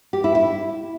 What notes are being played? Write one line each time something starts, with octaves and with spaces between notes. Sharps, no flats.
G4
E4
E4